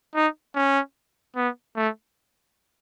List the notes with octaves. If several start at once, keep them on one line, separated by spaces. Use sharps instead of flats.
D#4
C#4
B3
A3